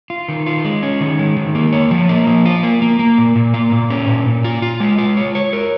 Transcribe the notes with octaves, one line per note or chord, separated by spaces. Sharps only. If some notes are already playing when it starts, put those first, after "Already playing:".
F4
D#3
F4
G#3
C#4
D#3
G#3
D#3
A#3
C#5
F3
A#3
F3
F4
A#3
A#3
A#3
A#2
A#2
A#3
A#2
C#4
A#2
A#2
F4
F4
G#3
F4
C#5
C#5
A#4